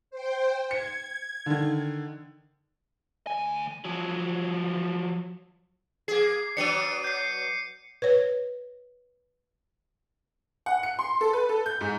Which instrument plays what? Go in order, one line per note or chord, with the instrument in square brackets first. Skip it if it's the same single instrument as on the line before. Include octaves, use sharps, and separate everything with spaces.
[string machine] C5 G5
[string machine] G#6 [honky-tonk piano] C#7
[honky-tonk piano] D3 D#3
[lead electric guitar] D2 G#5
F3 F#3
[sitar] A#3 G#4 [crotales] C7
[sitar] F#3 B3 D4 [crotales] C#7 D#7
[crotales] G6 C7
[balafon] B4 C#5
[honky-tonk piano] F#5
C#7
C6
A4
B4
A4
G6
G#2